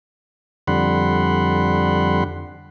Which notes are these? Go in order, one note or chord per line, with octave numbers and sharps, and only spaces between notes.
F2 D3 G3 F#5 B5 C6